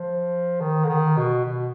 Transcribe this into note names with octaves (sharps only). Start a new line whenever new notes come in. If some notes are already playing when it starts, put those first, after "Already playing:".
Already playing: F3
D#3
D3
D#3
B2
B2